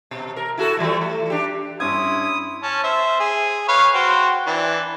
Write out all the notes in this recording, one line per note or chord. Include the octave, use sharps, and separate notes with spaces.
B2
A#4
E4 F#4 A4
E3 G3 A3
A3
D4 G4
G2 C#4 E4 C6 D#6 G#6
C#4 A5
C5 E5
G#4
B4 C#5 F5
F#4 C5 G5
E3 D4